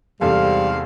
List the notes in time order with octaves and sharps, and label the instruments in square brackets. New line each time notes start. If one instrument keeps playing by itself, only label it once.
[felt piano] E2 C3 A4 [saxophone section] G#2 C5 F5 [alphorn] G3